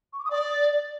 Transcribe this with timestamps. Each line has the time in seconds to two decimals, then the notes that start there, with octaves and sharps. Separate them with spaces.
0.12 C#6
0.18 D6
0.24 D#6
0.30 D5